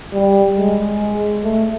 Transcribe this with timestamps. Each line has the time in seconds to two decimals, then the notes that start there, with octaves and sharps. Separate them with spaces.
0.13 G3
0.57 G#3
1.44 A3